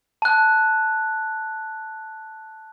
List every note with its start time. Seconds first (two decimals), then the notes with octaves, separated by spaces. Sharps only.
0.22 A5 F#6